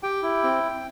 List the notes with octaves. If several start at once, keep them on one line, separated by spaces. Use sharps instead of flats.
G4 G5
E4
C4